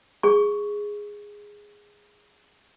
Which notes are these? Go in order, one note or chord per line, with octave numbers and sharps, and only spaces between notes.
G#4 C#6